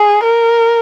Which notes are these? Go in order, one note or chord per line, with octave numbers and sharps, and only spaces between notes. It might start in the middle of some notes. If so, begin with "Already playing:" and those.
Already playing: G#4
A#4